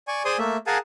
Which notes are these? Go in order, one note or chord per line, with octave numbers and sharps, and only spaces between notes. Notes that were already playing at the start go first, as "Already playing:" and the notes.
D5 G#5 C#6
G#4 C5 D5 G#5 C6 D#6
A3 A#3 E5
G#4 A#4 F5 F#5 G#5 A5